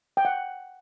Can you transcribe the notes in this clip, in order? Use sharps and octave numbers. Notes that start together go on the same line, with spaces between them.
G5
F#5